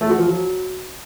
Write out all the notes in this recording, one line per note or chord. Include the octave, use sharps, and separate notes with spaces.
A3
F#4
F3
F#3